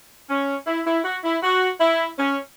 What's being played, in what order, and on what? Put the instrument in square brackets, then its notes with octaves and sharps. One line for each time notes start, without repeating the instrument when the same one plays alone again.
[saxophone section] C#4
E4
E4
F#4
E4
F#4
E4
C#4